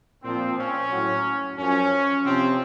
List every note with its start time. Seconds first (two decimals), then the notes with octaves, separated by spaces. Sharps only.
0.24 A#2 F3 C4
0.57 C#4
0.91 A2 F#3
1.58 F#2 F3 C#4
2.24 C3 F3 C4